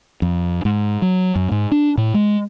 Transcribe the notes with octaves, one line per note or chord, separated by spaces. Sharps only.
F2
G#2
F#3
F#2
G#2
D4
A2
G#3